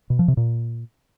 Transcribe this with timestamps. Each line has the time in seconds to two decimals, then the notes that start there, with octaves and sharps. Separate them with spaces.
0.10 B2
0.19 F3
0.28 C3
0.37 A#2